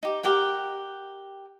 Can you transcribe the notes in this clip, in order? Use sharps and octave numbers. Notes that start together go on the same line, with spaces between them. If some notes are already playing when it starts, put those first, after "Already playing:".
D#4 G4
G4 A#4 F#5 G5